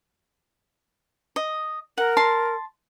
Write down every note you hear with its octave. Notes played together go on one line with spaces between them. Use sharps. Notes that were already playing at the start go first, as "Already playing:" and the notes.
D#5
A#4 F#5
A5 C6